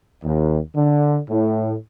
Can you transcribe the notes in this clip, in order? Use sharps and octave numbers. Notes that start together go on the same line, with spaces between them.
D#2
D3
A2